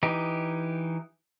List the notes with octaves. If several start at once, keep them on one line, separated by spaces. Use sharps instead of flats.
E3 D#4 G4